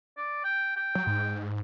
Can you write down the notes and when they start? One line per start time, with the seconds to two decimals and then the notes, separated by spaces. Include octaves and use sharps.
0.17 D5
0.44 G5
0.76 G5
0.95 F#3
1.07 G#2